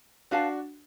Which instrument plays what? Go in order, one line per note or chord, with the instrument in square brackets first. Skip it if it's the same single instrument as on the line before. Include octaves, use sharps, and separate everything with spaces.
[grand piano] D4 F#4 [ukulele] B4 F5 A5